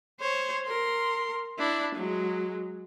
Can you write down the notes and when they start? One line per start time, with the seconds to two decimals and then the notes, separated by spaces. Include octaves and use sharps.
0.20 C5 C#5
0.67 A#4 C6
1.58 D4 E4
1.95 F#3 G#3